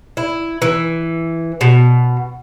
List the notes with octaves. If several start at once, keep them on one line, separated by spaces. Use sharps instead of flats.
E4
E3
B2